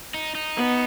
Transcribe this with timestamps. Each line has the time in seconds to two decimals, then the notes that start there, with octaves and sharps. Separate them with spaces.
0.14 D#4
0.35 D#4
0.56 B3